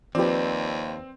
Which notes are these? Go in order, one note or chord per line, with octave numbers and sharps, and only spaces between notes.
D#2 F3 C4 G4 B4 D5